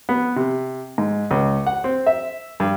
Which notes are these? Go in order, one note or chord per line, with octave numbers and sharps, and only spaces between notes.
B3
C3
G#2
C#2
F#5
C4
E5
G2